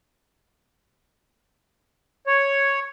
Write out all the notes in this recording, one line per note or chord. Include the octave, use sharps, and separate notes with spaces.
C#5